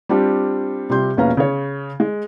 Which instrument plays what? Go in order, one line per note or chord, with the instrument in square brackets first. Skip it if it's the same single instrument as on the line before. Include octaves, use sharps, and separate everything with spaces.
[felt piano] G3 C4 D4 F4 G4
C3 G3 F4 C6 G6
E1 A#1 C#4 B4 F5 A#5
C#3 C#5
G#3